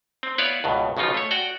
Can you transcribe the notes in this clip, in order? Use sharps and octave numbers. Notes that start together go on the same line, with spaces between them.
C4
B3 E4 B4 C#5 D5 F5
C#2 G2 B2
B1 C#3 F3 D#4 F4
A3 C#5
F#4 D5 G5